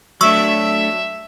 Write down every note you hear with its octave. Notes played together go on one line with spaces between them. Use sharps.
F#3 A3 D4 E5 C#6 E6